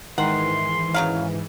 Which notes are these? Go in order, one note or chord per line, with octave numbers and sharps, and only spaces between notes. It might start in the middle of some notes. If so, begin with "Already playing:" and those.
G#2 D#3 E3 F#5 C6
C#3 F#3 F5